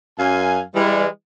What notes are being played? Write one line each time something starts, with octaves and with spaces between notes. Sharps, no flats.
F#2 F5 G#5
E3 G3 G#3